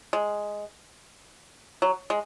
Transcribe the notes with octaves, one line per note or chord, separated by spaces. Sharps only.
G#3
F#3
G#3